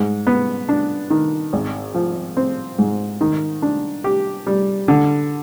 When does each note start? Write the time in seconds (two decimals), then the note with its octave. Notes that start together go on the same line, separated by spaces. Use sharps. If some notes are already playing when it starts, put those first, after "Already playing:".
Already playing: G#2
0.27 B3
0.69 D4
1.10 D#3
1.53 G#1
1.94 F3
2.37 C4
2.78 G#2
3.21 D#3
3.62 D4
4.04 G4
4.47 G3
4.88 D3